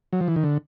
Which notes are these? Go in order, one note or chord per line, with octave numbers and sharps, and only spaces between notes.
F#3
F3
E3
D#3
D3